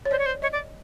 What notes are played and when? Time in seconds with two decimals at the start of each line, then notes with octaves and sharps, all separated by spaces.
0.05 C#5
0.11 C5 D5
0.19 C#5
0.26 C5
0.42 C#5 D#5
0.53 D5